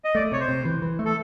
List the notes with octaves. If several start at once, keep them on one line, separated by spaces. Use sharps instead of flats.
D#5
A3 D5
C3 C#5
C5
C3
E3
E3
A3
A4